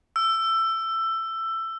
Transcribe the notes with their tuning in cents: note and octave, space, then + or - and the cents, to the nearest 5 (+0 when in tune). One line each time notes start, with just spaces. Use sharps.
E6 +15